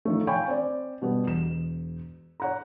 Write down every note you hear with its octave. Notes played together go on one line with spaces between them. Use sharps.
D#3 F3 A3
C#5 F5 G5 G#5 B5 C#6
C4 D5
B2 G3 B3
E1 E7
C#5 F#5 A#5